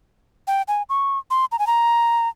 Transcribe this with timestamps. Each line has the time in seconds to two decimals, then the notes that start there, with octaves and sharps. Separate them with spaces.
0.48 G5
0.68 G#5
0.89 C#6
1.31 C6
1.52 A#5
1.59 G#5
1.67 A#5